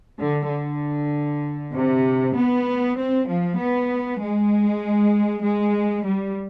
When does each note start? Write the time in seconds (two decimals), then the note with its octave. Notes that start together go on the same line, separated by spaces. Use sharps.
0.19 D3
0.50 D3
1.74 C3
2.34 B3
2.97 C4
3.28 F3
3.58 B3
4.20 G#3
5.43 G#3
6.05 G3